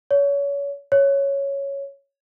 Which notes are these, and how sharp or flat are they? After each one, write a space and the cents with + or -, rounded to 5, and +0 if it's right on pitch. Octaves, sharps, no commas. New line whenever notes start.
C#5 +30
C#5 +0